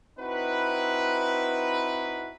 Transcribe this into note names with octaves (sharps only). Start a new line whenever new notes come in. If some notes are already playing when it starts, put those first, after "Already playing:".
C4 D#4 E4 F#4 B4